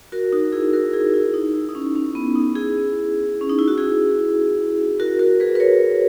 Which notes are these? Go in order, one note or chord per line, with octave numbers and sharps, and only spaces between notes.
F#4 A#4
D#4 F#4
E4 G#4
F#4 A#4
E4 G#4
E4
D#4
E4
D#4
C#4
C#4
B3
D#4
E4 G#4
C#4
D#4
E4
F#4
E4 G#4
F#4 A#4
F#4 A#4
G#4 B4
B4
A#4 C#5